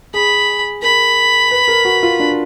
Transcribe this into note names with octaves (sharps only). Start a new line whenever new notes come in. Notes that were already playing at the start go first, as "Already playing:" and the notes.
G#4 B5
A#4 B5
B4
A#4
F#4
F4
D4